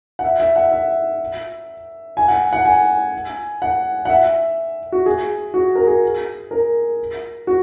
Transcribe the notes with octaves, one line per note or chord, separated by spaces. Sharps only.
F#5
E5
E5
F#5
E5
G#5
F#5
F#5
G#5
F#5
F#5
E5
F#4
G#4
F#4
A#4
G#4
A#4
F#4